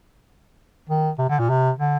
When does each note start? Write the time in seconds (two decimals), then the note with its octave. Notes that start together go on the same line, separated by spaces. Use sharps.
0.90 D#3
1.19 C3
1.29 D3
1.39 A#2
1.50 C3
1.79 D3